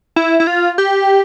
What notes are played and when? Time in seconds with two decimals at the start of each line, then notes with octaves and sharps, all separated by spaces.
0.16 E4
0.40 E4
0.47 F4
0.78 G4